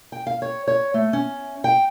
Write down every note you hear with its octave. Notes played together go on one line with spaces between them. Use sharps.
G5
F5
C#5
C#5
A3
C#4
G5